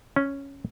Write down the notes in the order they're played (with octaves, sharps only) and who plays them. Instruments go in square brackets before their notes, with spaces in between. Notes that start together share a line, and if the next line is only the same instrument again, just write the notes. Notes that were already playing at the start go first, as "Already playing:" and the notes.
[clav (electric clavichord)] C#4